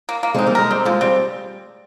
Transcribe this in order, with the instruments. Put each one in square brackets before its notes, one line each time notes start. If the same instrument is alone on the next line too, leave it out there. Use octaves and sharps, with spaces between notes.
[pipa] A#3
A#3
[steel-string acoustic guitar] G#3 C4 [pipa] D#4
[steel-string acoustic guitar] G3 A#3
[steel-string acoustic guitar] G#3 [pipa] A#4
[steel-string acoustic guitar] G3 [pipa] C4
[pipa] F3 [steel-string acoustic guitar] G#3
[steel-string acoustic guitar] G3 [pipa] C4